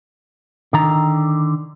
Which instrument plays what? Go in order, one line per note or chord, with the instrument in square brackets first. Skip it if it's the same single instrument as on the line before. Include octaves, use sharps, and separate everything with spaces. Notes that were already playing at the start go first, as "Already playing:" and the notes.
[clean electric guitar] D3 D#3 A#5